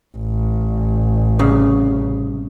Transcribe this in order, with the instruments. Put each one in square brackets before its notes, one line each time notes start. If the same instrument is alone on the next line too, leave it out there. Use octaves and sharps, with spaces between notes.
[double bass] A1
[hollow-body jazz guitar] C2 C#3